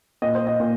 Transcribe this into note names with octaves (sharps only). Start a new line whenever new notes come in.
A#2 D#5
C5
D#5
A#2